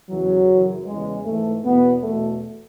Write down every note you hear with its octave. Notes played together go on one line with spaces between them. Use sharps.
E2 C#3 E3 F#3
F#2 C#3 E3
E2 C#3 E3 G#3
G#2 E3 A3
E2 B2 B3
E2 B2 A3